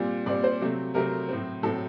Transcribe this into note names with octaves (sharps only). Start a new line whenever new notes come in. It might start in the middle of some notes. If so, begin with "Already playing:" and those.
Already playing: A#2 G3 C4
A#2 G3 C4 D5
C5
C3 F#3 A3 C4
C3 F#3 A3 C4 A#4
A2 F#3 C4
A2 F#3 C4 A4